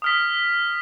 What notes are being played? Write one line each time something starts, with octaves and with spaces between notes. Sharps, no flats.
D#6 F6 B6